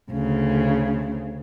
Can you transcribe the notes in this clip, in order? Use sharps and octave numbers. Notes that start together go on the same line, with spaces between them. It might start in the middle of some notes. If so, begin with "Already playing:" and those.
D2 C#3